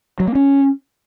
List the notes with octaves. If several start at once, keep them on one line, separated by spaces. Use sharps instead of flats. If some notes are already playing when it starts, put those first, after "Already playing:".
F#3
A#3
C#4